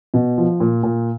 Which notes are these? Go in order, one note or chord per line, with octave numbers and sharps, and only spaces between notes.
B2
F3
A#2
A#2